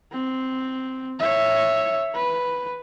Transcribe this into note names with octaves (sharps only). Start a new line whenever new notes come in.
C4
C#5 E5
B4